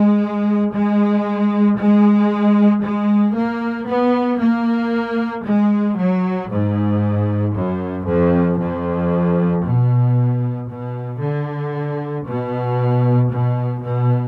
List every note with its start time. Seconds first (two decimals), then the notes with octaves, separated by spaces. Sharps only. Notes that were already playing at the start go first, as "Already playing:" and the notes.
Already playing: G#3
0.74 G#3
1.78 G#3
2.84 G#3
3.36 A#3
3.88 B3
4.40 A#3
5.45 G#3
5.98 F#3
6.50 G#2
7.55 F#2
8.07 F2
8.59 F2
9.65 B2
10.69 B2
11.21 D3
12.26 B2
13.32 B2
13.83 B2